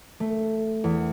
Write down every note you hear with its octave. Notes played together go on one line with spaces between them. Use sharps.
A3
E2